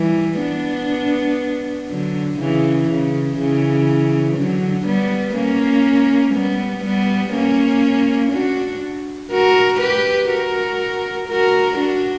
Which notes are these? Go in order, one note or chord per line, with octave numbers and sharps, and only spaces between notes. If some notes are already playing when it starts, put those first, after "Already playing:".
Already playing: E3 G3
B3 D4
D3 F#3
C#3 E3
C#3
C#3 E3
D3 F#3
G3 B3
A#3 C#4
G3 B3
G3 B3
A#3 C#4
D4 F#4
F#4 A#4
G4 B4
F#4 A#4
F#4 A#4
D4 F#4